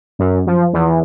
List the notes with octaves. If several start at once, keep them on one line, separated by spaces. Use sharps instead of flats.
F#2
F3
E2